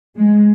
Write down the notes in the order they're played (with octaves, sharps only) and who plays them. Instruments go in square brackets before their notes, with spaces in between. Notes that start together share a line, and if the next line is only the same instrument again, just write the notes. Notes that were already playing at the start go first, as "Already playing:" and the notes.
[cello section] G#3